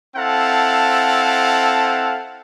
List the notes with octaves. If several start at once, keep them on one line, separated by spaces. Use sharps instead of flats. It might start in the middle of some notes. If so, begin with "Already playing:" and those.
C4 E4 A4 F5 F#5 A5